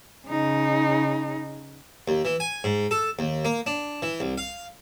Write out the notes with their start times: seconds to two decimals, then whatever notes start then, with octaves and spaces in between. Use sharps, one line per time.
0.28 C#3 D#4
2.08 D#2
2.25 E3
2.40 G#5
2.64 G#2
2.91 A4
3.19 D#2
3.45 A#3
3.67 D4
4.02 E3
4.20 C2
4.38 F5